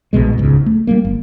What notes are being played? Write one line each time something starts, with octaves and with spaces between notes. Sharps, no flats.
A#1 D#2 B2 G#3
D#1 C#2 G#2
A3
G3 A3 A#3
G1